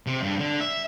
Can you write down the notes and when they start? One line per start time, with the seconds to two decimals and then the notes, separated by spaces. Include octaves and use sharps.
0.07 C3
0.23 G2
0.39 D3
0.60 E5